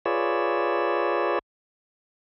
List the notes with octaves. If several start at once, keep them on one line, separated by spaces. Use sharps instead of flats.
F4 G#4 B4 C#5 D5 E6